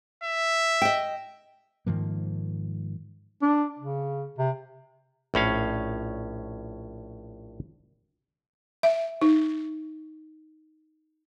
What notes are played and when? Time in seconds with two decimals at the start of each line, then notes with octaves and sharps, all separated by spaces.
0.24 E5
0.82 D#5 G5
1.87 G#2 D#3 F3 A#3
3.42 D4
3.79 C#3
4.38 C3
5.34 A#1 A2 C#4 F5
8.83 E5
9.21 D#4